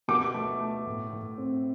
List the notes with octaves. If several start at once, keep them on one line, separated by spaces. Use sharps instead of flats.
B2 D6
A3
A3
A2
A2
C4